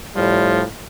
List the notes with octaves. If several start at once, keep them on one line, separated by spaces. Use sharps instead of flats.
A2 F3 G3